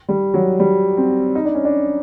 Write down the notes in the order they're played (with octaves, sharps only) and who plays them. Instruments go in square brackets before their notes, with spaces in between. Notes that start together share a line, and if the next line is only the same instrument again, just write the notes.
[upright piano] G3
F#3
G3
C4
D#4
D4
C#4
D4